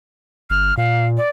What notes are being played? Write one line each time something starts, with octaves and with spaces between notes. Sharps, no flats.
G1 F6
A#2 F5
D5